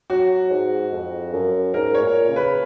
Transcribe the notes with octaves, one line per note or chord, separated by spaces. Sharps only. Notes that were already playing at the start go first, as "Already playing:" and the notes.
F#3 F#4
G#2
F2
F#2
G#2 A#4
C#5
A#2
C#3
B4